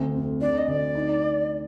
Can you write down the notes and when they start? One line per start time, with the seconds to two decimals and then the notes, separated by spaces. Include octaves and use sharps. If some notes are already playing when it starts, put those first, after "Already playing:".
Already playing: D2 C4
0.15 F2
0.41 D4 D5
0.58 D#5
0.68 D2 D5
0.95 D#4